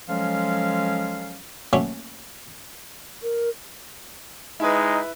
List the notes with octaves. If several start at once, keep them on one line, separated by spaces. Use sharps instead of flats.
F3 F#3 G#3 C#4 A4 F5
F#3 A3 A#3 C#4
A#4
G#3 D#4 E4 B4